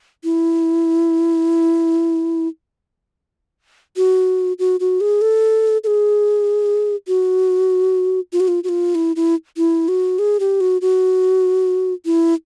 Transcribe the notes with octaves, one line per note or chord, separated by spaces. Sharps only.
E4
F#4
F#4
F#4
G#4
A4
A4
G#4
F#4
F4
F#4
F4
F#4
F4
E4
E4
E4
F#4
G#4
G4
F#4
F#4
E4